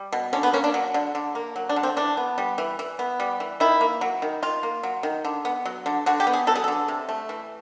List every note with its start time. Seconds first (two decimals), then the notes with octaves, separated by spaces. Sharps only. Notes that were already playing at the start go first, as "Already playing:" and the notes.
Already playing: G3
0.12 B2
0.33 D3 C#4
0.43 B3
0.53 A#3 C#4
0.64 D4
0.74 F#3
0.94 D3
1.15 D3
1.35 A#3
1.56 F#3
1.69 D4
1.76 D3
1.83 C4
1.97 E3 D4
2.17 B3
2.38 G3
2.58 E3
2.79 E3
2.99 B3
3.20 G3
3.40 E3
3.60 D#3 E4
3.81 A#3
4.01 F#3
4.22 D#3
4.42 D#3 F4
4.63 A#3
4.83 F#3
5.03 D#3
5.24 D3
5.45 B3
5.65 F#3
5.86 D3
6.06 D3 F#4
6.20 G4
6.27 B3
6.33 G#4
6.47 F#3 A4
6.56 G#4
6.64 D3 A4
6.88 C3
7.09 A3
7.29 E3